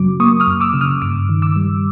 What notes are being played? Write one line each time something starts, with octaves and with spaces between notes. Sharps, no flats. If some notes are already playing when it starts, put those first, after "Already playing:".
Already playing: F#2 C#3 F#3 D6
A#3 C#6 D#6
D#6 F6
F#2
D6 E6
C#3
D#6 F6
G2 D6 E6
D#3
D6 E6
G3